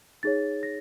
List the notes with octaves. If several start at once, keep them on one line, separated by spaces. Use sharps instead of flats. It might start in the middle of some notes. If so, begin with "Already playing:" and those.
D#4 G#4 C#5 A6
A#6